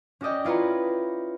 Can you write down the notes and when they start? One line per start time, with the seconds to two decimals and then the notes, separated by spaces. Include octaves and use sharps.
0.21 C#4 F#4 D5 D#5 G5
0.45 E4 F4 B4 C#5 A#5